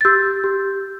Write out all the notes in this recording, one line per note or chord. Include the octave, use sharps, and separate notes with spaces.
A6
G4 E6 G6
G4